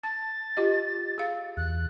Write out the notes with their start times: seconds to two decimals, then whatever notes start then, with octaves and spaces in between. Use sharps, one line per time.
0.03 A5 A6
0.57 F4 G4 D#5
1.18 G#4 F5
1.57 E2 F#6